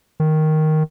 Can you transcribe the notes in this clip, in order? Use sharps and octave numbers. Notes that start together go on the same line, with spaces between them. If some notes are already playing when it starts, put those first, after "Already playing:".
D#3